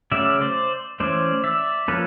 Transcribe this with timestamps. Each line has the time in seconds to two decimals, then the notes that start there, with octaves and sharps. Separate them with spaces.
0.12 C#3 F#3 A3 C#4 D5 E5
0.41 C5 D5
1.00 E3 A3 C#4 C5 D5
1.44 D5 E5
1.88 F3 A#3 C#4 A4 B4